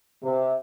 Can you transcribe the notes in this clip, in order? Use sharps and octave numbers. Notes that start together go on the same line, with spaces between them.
C3